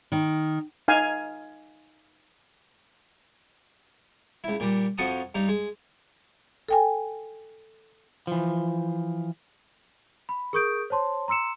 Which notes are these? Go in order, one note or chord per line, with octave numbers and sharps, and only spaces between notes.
D#3
D#4 F5 G#5
C#2 E4
A#2 G3
F2 F3 F#4 F#5 A5 D#6
G2 D#4
G#3
A4 G5 G#5
E3 F3
B5
G#4 A#4 C#6 D#6 G6 D7
C5 C#5 A5 C6
A#5 C6 E6 C#7 E7